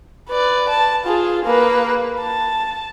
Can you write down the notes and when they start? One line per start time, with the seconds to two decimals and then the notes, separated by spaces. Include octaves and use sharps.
0.29 B4 D5
0.69 A5
1.05 F4 G#4
1.45 A#3 B4
2.20 A5